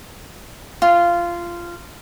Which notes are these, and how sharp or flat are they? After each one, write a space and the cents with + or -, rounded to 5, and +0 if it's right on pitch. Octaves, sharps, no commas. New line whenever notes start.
F4 -15